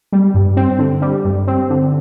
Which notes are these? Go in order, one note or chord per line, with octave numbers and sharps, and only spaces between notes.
G3
G2
C4
D3
G3
G2
C4
D3